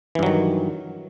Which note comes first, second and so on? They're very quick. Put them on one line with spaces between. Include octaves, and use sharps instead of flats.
E3 G2 F#3 D#3